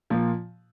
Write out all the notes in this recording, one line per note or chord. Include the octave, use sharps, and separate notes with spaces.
A#2 F3 A#3